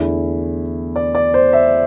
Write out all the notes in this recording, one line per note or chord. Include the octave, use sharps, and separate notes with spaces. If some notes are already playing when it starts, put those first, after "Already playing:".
Already playing: E2 D3 A3 E4
D5
D5
C5
E5